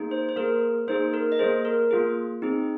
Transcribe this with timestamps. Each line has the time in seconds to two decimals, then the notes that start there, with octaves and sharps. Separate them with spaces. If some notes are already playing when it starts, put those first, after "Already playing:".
Already playing: A#3 D#4 G#4
0.11 C5
0.29 C5
0.36 A#3 G#4 A#4
0.88 A#3 D#4 G#4 C5
1.13 A#4
1.32 D#5
1.39 A#3 G#4 C5
1.65 A#4
1.91 A#3 F4 G#4
2.42 C4 D#4 G#4